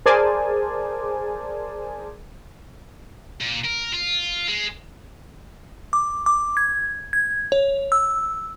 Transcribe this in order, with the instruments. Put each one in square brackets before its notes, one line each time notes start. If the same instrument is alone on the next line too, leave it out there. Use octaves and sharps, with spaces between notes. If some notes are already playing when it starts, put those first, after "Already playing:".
[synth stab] G#4 A#4 C5 D5 G#5 A5
[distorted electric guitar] A#2
A#4
F4
G#3
[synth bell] D6
D6
G#6
G#6
C#5
E6